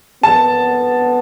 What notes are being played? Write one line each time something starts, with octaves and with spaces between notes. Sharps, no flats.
B3 A5